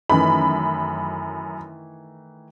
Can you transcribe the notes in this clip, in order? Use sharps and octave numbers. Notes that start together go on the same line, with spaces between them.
F#2 D#3 E3 A3 B5